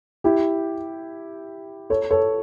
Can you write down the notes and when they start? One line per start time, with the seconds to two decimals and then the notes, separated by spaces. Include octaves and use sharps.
0.24 E4 G4
1.90 A4 C#5
2.10 A4 C#5